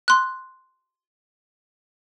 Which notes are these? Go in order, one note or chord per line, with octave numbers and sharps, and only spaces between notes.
C6 F#6